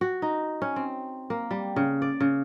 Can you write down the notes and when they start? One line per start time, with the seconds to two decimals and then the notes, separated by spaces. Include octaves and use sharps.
0.01 F#4
0.22 D#4
0.62 C#4
0.76 C4
1.30 A#3
1.51 G3
1.76 C#3
2.02 D5
2.20 C#3